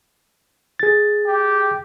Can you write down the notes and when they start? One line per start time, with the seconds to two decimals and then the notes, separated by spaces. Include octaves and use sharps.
0.79 G#4 A6
1.27 G4